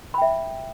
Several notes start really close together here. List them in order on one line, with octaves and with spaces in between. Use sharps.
B5 G5 E5